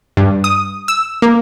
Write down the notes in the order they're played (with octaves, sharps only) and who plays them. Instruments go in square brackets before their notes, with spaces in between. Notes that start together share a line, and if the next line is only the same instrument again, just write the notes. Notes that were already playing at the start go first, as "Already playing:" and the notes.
[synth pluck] G2
D#6
E6
A#3